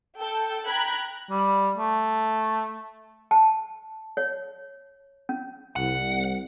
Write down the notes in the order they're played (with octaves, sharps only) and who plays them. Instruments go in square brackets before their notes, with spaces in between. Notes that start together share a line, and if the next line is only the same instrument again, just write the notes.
[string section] A4 G5
G5 A#5 B5 F#6 G#6
[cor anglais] G3
A3
[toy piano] A5
C#5
C#4
[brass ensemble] C2 [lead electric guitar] F#5